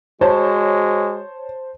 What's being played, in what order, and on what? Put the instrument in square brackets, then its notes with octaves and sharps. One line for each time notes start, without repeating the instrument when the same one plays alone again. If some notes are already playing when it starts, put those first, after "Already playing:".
[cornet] G#3 [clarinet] F#4 [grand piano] C5 A5 [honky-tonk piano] C#5